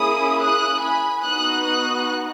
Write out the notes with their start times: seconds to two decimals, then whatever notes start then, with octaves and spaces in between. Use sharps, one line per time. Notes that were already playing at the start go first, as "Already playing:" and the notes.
Already playing: A#3 C#4 E4 G#4 B5 D#6
0.39 D#6 F#6
0.80 G#5 B5
1.22 B3 D#4 F#4 D#6 F#6
1.63 D#6 F#6